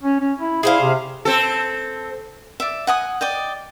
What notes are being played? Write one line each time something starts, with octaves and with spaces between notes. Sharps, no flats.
C#4
C#4
E4
E4 G#4 C5 F5
C3
C4 A4
D5 E5
F#5 G#5 D#6
D5 D#5 G5